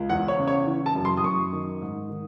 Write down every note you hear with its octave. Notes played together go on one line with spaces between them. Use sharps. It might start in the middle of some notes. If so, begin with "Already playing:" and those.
Already playing: C#2
E2 F#5
C#5
C#3
C#5
E3
A5
F#2
C6
D#6
F#2 C#6
D#3
G#2
D#3